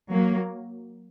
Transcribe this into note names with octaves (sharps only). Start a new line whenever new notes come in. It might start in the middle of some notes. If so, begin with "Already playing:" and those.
F#3 A#3